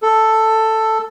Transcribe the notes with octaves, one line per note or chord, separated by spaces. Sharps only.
A4